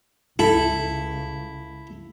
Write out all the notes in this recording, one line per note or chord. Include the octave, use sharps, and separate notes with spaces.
C#2 E4 A4